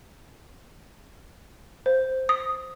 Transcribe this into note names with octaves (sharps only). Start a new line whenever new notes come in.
C5
D#6